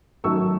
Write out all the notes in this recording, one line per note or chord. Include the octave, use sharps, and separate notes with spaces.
F#2 D#3 F#3 A3 C#6 E6